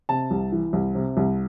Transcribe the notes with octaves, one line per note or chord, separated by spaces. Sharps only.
C3 A5
C2
E3
C2
C3
C2